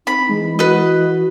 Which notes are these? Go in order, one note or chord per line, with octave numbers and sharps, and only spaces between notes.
C4 D#4 B5
E3 G#3
F#4 B4 D#5